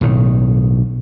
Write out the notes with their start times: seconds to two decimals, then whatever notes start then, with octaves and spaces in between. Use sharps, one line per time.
0.01 B1 A2 D#3